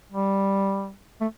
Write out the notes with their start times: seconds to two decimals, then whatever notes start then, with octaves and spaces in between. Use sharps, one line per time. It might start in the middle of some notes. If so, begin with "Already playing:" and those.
0.12 G3
1.21 A3